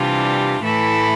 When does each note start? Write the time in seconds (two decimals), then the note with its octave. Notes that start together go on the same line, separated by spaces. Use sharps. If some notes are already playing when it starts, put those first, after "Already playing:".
Already playing: C3 E3 G3 D4 F4
0.61 A2 E3 A3 E4 A4